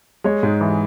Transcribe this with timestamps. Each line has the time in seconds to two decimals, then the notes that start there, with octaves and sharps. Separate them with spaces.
0.24 G#3 C#5
0.43 G#2
0.61 E3